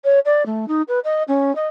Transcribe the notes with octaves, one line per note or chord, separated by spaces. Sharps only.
C#5
D5
A3
D#4
B4
D#5
C#4
D#5